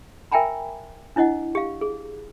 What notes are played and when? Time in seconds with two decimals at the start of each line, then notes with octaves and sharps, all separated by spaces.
0.32 A#4 E5 G5 G#5 A#5 B5
1.16 D4 E4 C#5 D#5 F#5
1.55 G4 F5
1.81 G#4